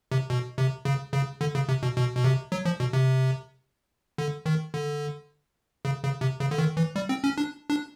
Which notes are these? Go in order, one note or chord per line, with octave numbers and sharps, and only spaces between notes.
C3
B2
C3
C#3
C#3
D3
C#3
C3
B2
B2
B2
C3
F#3
F3
B2
C3
D3
D#3
D3
C#3
C#3
C3
C#3
D3
D#3
E3
G3
C4
C#4
D4
D4